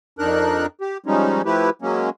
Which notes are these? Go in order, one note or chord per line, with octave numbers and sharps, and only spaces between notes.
F2 D4 D#4 A#4 F#6
G4
F3 G3 G#3 C#4 D#4
F3 A3 E4 G4 B4
F#3 G#3 A#3 C#4